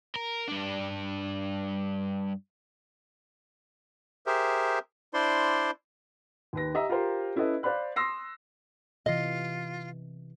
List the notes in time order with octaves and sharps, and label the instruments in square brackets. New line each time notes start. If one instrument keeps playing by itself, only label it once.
[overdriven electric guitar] A#4
G2 D4
[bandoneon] G4 G#4 A#4 C5 E5
D4 E4 C5 D5 C6
[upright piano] D#2 B4 A#6
G4 D#5 E5 A#5
F4 G4 A#4 C5
C#4 E4 A4 B4 D#5
C5 D5 F5 B5 F#6
C6 D#6 E6 A#6 C7
[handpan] C3 E3 [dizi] F4 [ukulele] D#5